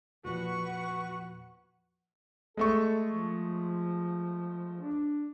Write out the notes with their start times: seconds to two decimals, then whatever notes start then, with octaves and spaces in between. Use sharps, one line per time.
0.25 E2 A#2 F3 F#4 B4 F#5 C#6
2.57 G#3 A3 A4 C#6
3.09 F3
4.81 D4